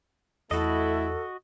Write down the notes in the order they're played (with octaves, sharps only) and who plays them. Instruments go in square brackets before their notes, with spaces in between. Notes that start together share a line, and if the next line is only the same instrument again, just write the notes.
[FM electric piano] E2 [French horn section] A3 E4 [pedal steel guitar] F#4 D#5 [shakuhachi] A4